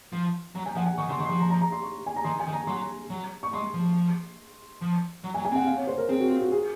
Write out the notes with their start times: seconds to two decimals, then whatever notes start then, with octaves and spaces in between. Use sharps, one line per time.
0.13 F3
0.55 F#3 A#5
0.66 G#5
0.75 F3 F#5
0.86 G#5
0.98 D#3 C#6
1.08 C#3 C6
1.18 D#3 C#6
1.25 C6
1.29 F3
1.40 A#5
1.50 A#5
1.61 A#5
1.72 C6
1.83 C#6
2.06 G#5
2.16 A#5
2.24 D#3 C6
2.40 G#5
2.47 D#3
2.53 A#5
2.67 F#3 C6
3.10 F#3
3.43 C#6
3.53 G#3 C6
3.74 F3
4.81 F3
5.24 F#3
5.34 G#5
5.37 F#3
5.45 G#5
5.52 C4 F#5
5.66 F5
5.77 C#5
5.87 C5
5.98 A#4
6.09 C4 G#4
6.20 F#4
6.30 F4
6.41 F#4
6.52 G#4